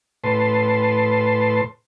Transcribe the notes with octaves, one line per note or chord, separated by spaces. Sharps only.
A2 B4 A5 C6